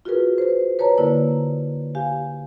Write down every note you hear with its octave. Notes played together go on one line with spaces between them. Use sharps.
F4 F#4 G#4 A#4 B4
B4 C5
B4 C#5 A5 A#5
D3 A#3 E4 A#4 B4 D5
G4 F5 G#5